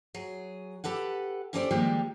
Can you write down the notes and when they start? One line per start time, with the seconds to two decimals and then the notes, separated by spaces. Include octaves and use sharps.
0.14 F#3 G#4
0.84 G4 A4 B4 F#5
1.53 C#4 E4 G4 A4 C5 D5
1.71 D#3 F3 G3 G#3 A#3 G4